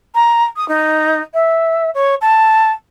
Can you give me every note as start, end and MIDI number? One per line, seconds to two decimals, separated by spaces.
0.15 0.44 82
0.57 0.67 87
0.69 1.22 63
1.34 1.90 76
1.94 2.15 73
2.21 2.71 81